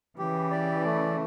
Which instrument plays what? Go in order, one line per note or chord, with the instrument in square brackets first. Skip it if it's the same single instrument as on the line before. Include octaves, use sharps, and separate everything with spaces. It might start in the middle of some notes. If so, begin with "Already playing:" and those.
[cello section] C#3 E3 [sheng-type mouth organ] G4
[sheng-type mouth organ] D5
A3